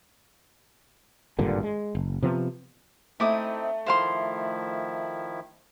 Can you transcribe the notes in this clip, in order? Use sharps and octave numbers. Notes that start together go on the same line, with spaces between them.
G#1 G2 A#2 D3
G#3
F#1
C3 F3 B3
A3 C4 D#4 E4 D6 D#6
D#3 F3 E4 C5 F5 C6